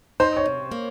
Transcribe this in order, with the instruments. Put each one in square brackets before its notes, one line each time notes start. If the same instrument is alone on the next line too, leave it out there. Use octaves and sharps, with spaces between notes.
[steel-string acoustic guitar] D#4 [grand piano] C5
[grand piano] C#5
[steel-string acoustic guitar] C3
A#3